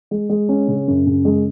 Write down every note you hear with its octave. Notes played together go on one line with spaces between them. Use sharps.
G#3
G#3
C#4
C#3
F#2
C#3
G#3